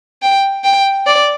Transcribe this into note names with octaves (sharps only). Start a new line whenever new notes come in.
G5
G5
D5